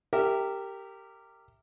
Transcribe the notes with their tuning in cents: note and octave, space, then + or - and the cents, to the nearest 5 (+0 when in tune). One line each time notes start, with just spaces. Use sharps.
G4 +0 A#4 -20 E5 +0